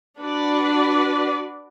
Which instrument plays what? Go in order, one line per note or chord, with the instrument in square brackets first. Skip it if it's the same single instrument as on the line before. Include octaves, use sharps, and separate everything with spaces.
[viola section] D4 F#4 B4 D5